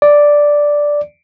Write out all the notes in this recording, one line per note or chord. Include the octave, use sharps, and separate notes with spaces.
D5